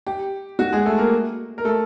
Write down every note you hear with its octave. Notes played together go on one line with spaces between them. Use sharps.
G4
F#4
G#3 G#4
A3 A4
A#3 A#4
A#4
A3 A4